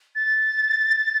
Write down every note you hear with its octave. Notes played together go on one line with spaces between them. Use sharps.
A6